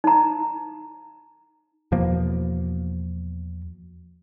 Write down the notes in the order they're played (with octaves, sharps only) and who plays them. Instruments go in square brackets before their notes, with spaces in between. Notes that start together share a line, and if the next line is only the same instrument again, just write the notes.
[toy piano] D#4 A#5
[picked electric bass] E2 B2 F3 A#3